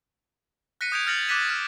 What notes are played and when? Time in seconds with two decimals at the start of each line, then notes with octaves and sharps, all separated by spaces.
0.81 F#6 A#6 B6 C#7 D#7
0.92 D#6 G6 G#6 D7 F7
1.07 F6 G6 A6 A#6 C#7 F#7
1.28 D6 F#6 A6 B6 D#7 E7
1.49 F6